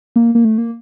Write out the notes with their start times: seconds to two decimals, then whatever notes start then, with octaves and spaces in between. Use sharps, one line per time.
0.16 A#3
0.35 A#3
0.45 A3
0.58 A#3